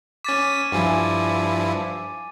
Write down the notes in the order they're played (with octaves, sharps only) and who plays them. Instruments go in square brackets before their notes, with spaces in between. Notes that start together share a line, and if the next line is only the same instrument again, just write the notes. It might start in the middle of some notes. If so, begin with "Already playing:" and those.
[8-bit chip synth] C#4 B6 [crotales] D6 A6 D#7
[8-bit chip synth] G2 F3 E4 [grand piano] G#5